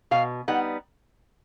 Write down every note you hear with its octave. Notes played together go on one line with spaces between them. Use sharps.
B2 F5
G3 B3 D#4 F#5